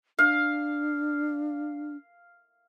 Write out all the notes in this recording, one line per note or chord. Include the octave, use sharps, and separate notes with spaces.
D4 F5